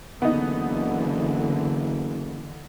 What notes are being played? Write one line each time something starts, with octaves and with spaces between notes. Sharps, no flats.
F#1 D3 E3 B3 D#4